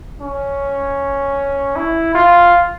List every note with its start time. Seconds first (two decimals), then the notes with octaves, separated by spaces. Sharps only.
0.21 C#4
1.76 E4
2.15 F4